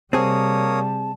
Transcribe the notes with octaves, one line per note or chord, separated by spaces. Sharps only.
C3 G3 A#3 C4 G#4 C#5 A5 D#6